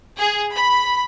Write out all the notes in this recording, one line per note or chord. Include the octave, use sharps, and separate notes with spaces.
G#4
B5